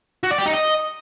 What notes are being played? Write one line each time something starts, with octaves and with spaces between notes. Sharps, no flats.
F#4
D5
G4
D#4
D#5